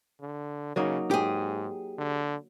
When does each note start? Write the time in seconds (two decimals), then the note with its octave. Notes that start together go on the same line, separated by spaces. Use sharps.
0.21 D3
0.76 C#3 F#3 A#3 D#4
1.11 G#2 G4 G#4
1.98 D3